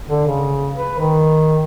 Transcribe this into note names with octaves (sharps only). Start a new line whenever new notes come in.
D3
C#3
B4
D#3